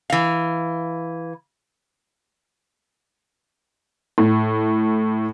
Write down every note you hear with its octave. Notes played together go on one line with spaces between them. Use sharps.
E3 F5
A2